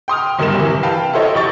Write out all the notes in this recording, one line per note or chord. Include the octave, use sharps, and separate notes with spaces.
G5 C6 D#6 F6
F#1 B1 G2 A#4 E7
C3 E3
B4 F5 G5 A5
E4 F4 A4 C5 C#5 D#5
F1 G4 C#6 A6